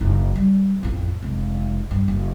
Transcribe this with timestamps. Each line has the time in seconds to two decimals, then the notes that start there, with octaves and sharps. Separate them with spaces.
0.01 F#1 D#4
0.36 G3
0.83 A1 F2
1.22 F1 G#3
1.91 G2
2.08 F#1